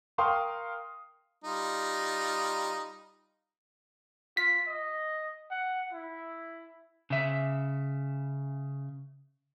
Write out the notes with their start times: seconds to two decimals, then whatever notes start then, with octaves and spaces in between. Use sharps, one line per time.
0.18 A#4 F5 G5 C6 C#6 D#6
1.44 G3 D#4 F4
4.37 F4 B6
4.67 D#5
5.50 F#5
5.92 E4
7.10 C#3 E5